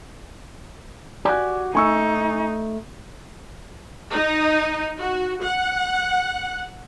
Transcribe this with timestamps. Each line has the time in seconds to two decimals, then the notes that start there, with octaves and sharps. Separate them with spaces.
1.25 F#4 G4 D5 G#5
1.75 A3 D#4 G#5 C#6 E6
4.12 D#4
4.99 F#4
5.44 F#5